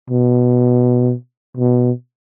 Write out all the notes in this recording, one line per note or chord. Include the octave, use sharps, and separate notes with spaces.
B2
B2